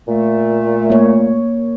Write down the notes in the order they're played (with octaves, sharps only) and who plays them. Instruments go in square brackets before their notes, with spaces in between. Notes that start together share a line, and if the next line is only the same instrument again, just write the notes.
[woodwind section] A#2 A3
[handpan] A#3 C#5